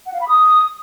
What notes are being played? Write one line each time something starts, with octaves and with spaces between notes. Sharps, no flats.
F#5
F5
B5
D#6